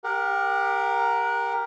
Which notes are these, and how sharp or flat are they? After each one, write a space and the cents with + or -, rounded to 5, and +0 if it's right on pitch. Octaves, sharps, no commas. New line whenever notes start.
G4 +15 A#4 +0 F#5 -30